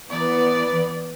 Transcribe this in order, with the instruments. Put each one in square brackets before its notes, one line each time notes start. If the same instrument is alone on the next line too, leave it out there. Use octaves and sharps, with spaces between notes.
[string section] E3 B3 [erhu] D5